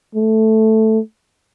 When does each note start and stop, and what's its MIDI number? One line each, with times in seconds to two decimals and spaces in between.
0.15 0.99 57